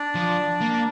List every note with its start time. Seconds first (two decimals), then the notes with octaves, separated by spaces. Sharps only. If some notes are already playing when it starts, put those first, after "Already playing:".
Already playing: D4 D5
0.15 F3
0.61 A#3
0.73 D5